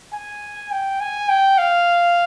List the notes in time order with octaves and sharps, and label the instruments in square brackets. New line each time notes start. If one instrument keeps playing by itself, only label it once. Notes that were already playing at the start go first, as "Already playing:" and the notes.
[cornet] G#5
G5
G#5
G5
F5